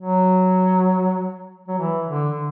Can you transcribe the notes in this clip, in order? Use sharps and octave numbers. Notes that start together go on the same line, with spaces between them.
F#3
F#3
E3
D3